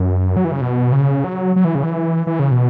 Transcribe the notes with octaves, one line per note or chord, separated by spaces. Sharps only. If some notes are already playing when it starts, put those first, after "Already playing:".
Already playing: F#2
F#3
E3
C#3
B2
C#3
F#3
F#3
E3
C#3
E3
E3
C#3
B2